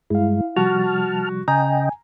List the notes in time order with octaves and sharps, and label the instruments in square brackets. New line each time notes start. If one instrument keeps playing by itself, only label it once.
[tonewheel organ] G2 G#3 [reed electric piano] E4 F5
[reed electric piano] C3 F3 G3 [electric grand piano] F#4 [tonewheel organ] A5 F6
[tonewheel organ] C#3 D#5 G5 [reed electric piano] G#5 [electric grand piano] A#5